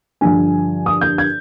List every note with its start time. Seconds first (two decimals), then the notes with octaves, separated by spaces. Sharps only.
0.21 G2 D3 F3 G#5
0.86 D#6
1.01 G6
1.18 G#6